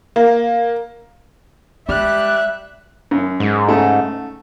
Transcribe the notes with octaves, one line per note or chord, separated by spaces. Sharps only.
A#3
G3 G#3 E5 F#6
F#2
G#2
C#3 A3 D#4